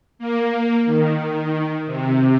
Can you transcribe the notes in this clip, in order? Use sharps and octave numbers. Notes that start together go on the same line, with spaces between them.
A#3
D#3
C3